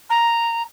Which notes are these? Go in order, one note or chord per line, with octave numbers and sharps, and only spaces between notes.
A#5